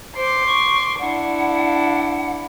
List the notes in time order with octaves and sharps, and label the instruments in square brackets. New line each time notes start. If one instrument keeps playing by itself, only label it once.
[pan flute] C5 [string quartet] C6 D6
[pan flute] C#6
[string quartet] D4 E4 [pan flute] F#5